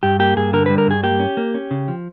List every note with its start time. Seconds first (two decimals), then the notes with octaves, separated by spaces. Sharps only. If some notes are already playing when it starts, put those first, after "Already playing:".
0.03 G2 G4
0.19 A#3 G4
0.37 G2 G#4
0.53 D3 A#4
0.66 G3 B4
0.78 A#4
0.87 G2 G#4
1.03 A#3 G4
1.20 C#4
1.37 A#3
1.54 C#4
1.71 C#3
1.88 F3